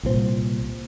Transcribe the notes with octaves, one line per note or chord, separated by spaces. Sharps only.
C2 A#2 F#3 C4